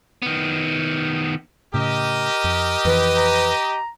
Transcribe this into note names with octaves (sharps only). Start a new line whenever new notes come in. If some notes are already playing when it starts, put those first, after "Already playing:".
D#3 B3
A2 C#3 G4 A#4 D#5
F2
F2 E3 B4
A#5